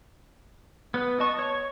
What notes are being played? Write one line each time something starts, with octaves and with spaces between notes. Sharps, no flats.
B3 B4
D#5 A5 C#6
C#5 C#6